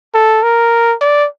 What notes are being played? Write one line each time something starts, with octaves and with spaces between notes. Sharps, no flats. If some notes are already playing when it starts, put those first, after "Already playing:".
A4
A#4
D5